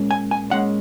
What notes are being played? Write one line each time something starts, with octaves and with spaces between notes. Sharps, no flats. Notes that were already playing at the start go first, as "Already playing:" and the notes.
Already playing: A#2 G#3 C#4
G#5
G#5
A#2 G#3 C#4 F#5